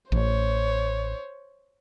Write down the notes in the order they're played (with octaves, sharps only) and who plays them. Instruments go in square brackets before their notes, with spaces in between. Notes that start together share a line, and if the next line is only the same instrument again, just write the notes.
[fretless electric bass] A1 [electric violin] C5 C#5